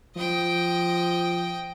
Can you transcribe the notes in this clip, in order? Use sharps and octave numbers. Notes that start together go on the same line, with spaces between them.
F3 D#5 G5